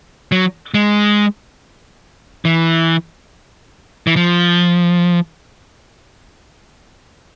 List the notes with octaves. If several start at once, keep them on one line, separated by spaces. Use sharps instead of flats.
F#3
G#3
E3
E3
F3